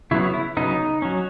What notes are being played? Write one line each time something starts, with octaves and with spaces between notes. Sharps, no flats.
C#3 F#3 B3 E4
E4
C#3 F#3 B3 D#4
F#3 C#4